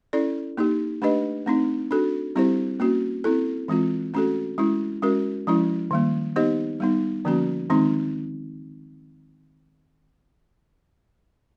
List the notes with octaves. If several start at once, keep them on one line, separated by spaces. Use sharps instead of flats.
C#4 E4 A4 D5
A#3 D#4 G4
A3 D4 G4 B4 D#5
A3 C4 D#4
D4 F#4 A4
G3 C4 E4 G4 C5
A#3 C#4 F#4
C4 E4 A4
E3 G#3 C4 F4
A3 C#4 F#4 A4
G#3 C#4 E4
G#3 C#4 F#4 A#4
F3 G#3 C#4 E4
D#3 G3 A#3
B3 D#4 G4 C5 D#5
G3 B3 D#4
D3 F3 A#3 C#4 F#4
D#3 G#3 C4 D#4